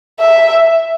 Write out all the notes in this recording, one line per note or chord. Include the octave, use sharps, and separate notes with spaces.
E5